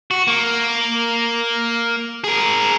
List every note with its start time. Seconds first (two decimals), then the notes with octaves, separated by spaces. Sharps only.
0.11 F#4
0.28 A#3
2.24 G#4 A#4